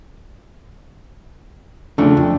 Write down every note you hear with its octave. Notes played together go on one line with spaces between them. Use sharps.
C#3 F3 A3 D4
F2